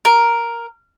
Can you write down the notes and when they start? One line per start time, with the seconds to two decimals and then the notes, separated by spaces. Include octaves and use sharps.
0.05 A#4